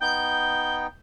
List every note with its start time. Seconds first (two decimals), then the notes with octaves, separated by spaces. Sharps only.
0.01 B3 D#4 G5 G6